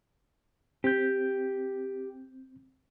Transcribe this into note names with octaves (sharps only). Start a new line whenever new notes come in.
C4 G4 G6